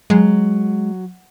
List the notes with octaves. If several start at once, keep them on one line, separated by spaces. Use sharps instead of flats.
F#3 G#3